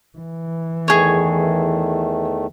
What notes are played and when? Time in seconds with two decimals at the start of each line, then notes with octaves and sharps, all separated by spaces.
0.18 E3
0.88 E2 D#3 A3 G#4 C#5